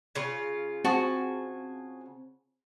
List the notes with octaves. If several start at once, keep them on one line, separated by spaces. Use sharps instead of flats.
C#3 F4
C4 F#4 G#4 A5